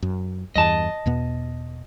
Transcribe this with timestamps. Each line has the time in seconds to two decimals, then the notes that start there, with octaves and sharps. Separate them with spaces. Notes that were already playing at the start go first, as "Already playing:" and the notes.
0.02 F#2
0.56 E2 G2 D#5 A5
1.06 E2 B2 B3